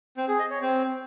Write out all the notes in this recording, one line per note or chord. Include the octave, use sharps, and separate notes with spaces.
C4
G#4
D#5
C#5
C4